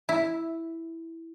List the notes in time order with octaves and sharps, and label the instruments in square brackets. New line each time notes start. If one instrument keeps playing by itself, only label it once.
[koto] E4